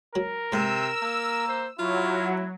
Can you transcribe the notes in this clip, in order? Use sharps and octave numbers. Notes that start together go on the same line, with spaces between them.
F#3 A#4
G#2 C3 A3 E6
A#3
C5
F#3 E4 F4